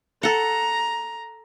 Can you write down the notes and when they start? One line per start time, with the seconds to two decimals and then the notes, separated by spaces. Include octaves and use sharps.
0.23 A4 F#5 A#5